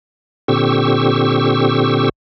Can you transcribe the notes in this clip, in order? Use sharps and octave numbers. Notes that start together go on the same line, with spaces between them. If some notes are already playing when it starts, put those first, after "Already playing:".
A#2 D3 C4 G4 C#6 E6